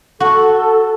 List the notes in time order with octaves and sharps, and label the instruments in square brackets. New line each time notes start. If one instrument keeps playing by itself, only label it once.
[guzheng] F#4 [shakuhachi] A4